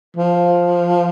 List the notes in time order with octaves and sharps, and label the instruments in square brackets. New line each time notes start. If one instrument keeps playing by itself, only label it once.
[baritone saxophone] F3